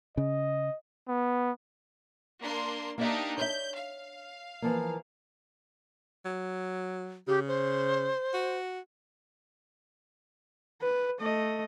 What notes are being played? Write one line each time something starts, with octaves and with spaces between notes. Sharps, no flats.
C#3 D#5
B3
A#3 D4 C6
A#3 D4 D#4 G4 E5
C#5 E5 G6
F5
E3 F3 A#3
F#3
C#3 G4
C5
F#4
B4
A3 D#5